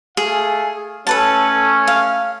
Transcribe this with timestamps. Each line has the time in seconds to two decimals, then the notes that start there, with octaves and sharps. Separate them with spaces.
0.17 A3 G#4 F5 G#5
1.07 A3 C#4 A4 B4 A5
1.87 F5